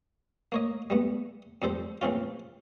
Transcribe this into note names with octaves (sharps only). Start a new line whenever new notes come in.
A#3 C#5 D#5
G3 A3 B3
F2 G3 A4 C5
A#1 E3 C4 C#4 F4